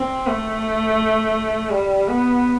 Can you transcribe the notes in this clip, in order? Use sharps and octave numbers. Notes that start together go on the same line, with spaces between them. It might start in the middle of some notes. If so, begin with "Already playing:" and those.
Already playing: C4
A3
G3
B3